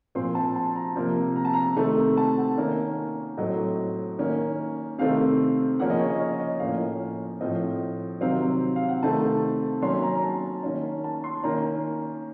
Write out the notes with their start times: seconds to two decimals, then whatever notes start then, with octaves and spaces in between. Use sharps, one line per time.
0.15 A#2 F3 C4 C6
0.35 A5
0.56 A5
0.76 A#5
0.96 C3 F3 A#3
1.36 A#5
1.45 A5
1.54 A#5
1.76 C3 D#3 A3 C4
2.17 A5
2.37 F#5
2.57 D#3 A#3 C#4
3.37 A2 F#3 A3 C4 D#5
4.19 D#3 A#3 C#4
4.98 C3 D#3 A3 C4 F5
5.80 C#3 F3 A#3 C#4 F#5
5.90 D#5
5.99 C#5
6.10 D#5
6.20 C#5
6.40 D#5
6.60 A2 F3 A#3 C#4 F5
7.41 A2 F3 C4 D#5
8.21 C3 D#3 F#3 C4 F5
8.76 F5
8.89 F#5
9.02 C3 D#3 A3 C4 A5
9.82 D#3 F#3 A#3 C#4 C6
10.02 A#5
10.15 A#5
10.24 A5
10.63 D#3 A#3 C#4
11.04 A5
11.24 C6
11.43 D#3 A#3 C#4 A#5